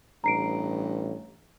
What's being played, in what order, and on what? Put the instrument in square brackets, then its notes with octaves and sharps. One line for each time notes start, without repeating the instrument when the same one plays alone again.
[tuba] A1 [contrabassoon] G2 [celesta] A#5 C7 D7